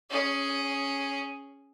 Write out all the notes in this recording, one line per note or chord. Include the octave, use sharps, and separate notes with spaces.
C#4 G#4